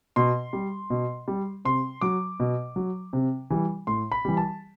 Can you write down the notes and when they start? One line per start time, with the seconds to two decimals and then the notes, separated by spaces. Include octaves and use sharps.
0.16 B2 C6
0.53 G3
0.90 B2
1.28 G3
1.65 C3 C6
2.01 F#3 D6
2.40 B2
2.76 F#3
3.13 C3
3.50 E3 G3
3.87 A2 C6
4.12 B5
4.25 E3 G3
4.37 A5